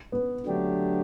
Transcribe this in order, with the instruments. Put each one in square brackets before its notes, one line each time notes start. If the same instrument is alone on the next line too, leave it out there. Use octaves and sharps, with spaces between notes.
[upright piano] B3
[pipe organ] D3 F#3 A3 D4 G4